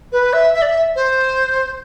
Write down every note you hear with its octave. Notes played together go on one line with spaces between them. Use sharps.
B4
E5
E5
D5
E5
C5